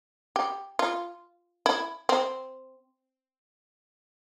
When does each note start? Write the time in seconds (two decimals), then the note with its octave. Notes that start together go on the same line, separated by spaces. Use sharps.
0.36 G4
0.79 F4
1.66 E4
2.09 C4